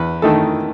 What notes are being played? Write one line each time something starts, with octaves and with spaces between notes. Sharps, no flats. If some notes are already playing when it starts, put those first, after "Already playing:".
Already playing: E2 B4
D#3 A3 D#4 A4